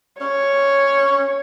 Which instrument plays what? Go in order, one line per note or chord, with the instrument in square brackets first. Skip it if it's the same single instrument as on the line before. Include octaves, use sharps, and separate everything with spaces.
[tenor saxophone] C#4 [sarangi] C#5